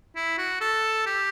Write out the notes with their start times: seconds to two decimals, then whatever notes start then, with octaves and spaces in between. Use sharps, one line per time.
0.16 E4
0.38 F#4
0.61 A4
1.06 G4